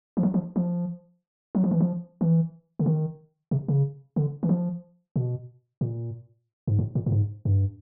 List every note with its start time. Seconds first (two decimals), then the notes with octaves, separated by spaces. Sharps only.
0.17 F3
0.23 F#3
0.34 F3
0.56 F3
1.55 F#3
1.64 F3
1.71 E3
1.81 F3
2.21 E3
2.79 D3
2.86 D#3
3.51 C3
3.68 C#3
4.16 D3
4.43 E3
4.49 F3
5.16 B2
5.81 A#2
6.67 G#2
6.79 A2
6.95 A#2
7.06 A2
7.12 G#2
7.45 G2